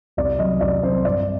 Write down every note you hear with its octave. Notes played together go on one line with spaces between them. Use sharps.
C2 D5
C3 F#3 C4 D#5
C2 D5
C3 F#3 C4 C5
G2 D5